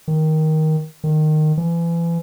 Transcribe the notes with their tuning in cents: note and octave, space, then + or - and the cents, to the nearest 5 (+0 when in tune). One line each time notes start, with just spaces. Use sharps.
D#3 +10
D#3 -15
E3 +35